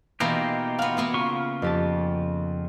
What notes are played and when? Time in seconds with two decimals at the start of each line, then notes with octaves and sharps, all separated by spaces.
0.20 B2 E3 A#3 D#4 F4 G4
0.79 B3 F#4 F5
0.97 A#3 B3 E4
1.14 C#3 F4 C#6
1.62 F2 G4 A5